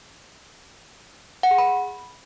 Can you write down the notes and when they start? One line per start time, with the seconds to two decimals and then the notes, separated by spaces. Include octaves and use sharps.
1.43 F#5
1.51 G#4
1.58 B5